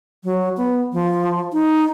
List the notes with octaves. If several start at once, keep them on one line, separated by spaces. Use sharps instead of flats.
F#3
B3
F3
D#4